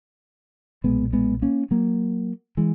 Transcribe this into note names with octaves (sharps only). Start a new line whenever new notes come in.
B1 A#2 G#3 B3
G#3 B3
A#3 C#4
F#3 A#3
E3 G#3